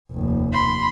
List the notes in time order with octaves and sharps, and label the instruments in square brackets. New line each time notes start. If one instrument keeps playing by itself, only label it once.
[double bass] F1 D#2
[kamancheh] B5 C6